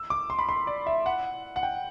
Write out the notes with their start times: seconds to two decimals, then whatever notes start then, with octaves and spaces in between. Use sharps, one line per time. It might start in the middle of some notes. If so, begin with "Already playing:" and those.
Already playing: E6
0.10 D6
0.30 C6
0.39 B5
0.49 C6
0.67 D5
0.87 E5
1.06 F#5
1.56 F#5
1.63 G5